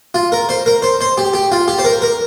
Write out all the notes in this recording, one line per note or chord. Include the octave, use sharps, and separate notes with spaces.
F4
A#4
C5
A#4
C5
C5
G4
G4
F4
G4
C5
A#4
A#4